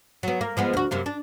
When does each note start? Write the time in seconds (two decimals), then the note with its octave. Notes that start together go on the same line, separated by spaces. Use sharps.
0.23 F#3 B3
0.41 A#3
0.57 F3 G#3 B3
0.73 D2 F#4
0.91 F#2 C3 A#3
1.06 D4